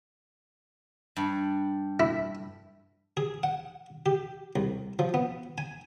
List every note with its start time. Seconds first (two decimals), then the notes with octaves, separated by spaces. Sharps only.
1.16 G2
2.00 E4
3.17 G#4
3.43 F#5
4.06 G4
4.56 C2
4.99 F3
5.14 B3
5.58 G#5